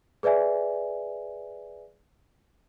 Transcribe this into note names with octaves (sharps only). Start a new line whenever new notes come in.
G#4 B4 D5 E5 G#5